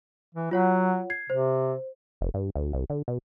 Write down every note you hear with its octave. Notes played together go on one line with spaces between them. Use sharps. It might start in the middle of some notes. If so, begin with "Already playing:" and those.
E3
F#3 F4 C#5 F#5
G#6 C7
C3 C5
F1
G2
D2
C2
D3
B2